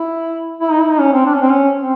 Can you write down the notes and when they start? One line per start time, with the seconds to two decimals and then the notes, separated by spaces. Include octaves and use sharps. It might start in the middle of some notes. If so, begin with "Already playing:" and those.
Already playing: E4
0.61 E4
0.71 D#4
0.81 E4
0.90 D#4
1.00 C#4
1.13 C4
1.26 D4
1.34 C#4
1.42 C4
1.49 C#4
1.78 C4